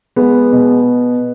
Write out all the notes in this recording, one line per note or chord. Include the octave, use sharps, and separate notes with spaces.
G#3 B3
B2